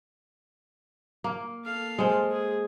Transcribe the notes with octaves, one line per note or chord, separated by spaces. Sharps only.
A#3
A4 F5
G#3 C5
G#4